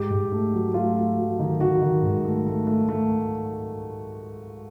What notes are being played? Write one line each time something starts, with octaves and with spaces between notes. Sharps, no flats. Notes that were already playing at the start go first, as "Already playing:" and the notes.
Already playing: G#2 G4
G#2
A3
F#3
A3 F4
A3
F#3
D#3
D#3 F#4
D#3
G#2
A3
A3
A3
A3